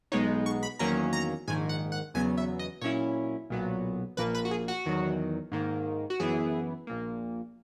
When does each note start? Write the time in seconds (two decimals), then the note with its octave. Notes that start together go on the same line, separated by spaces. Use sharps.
0.12 B1 B2 G#3 B3 D#4 C#5
0.46 C#6
0.63 B5
0.79 E2 D#3 F#3 A#3 C#4 A#5
1.13 A#5
1.47 A#1 G#2 D#3 G#5
1.69 F#5
1.92 F#5
2.14 E2 C#3 F#3 B3 G#5
2.38 E5
2.59 D#5
2.81 A#2 F#3 C#4 E4 C#5
3.50 B1 A#2 F#3 B3
4.17 A#1 A#2 A#3 B4
4.35 B4
4.45 F#4
4.51 G#4
4.68 F#4
4.85 E2 D#3 F#3
5.52 G#2 D#3 A#3
6.10 F#4
6.20 F#2 E3 B3 E4 G#4
6.87 A#1 A#2 A#3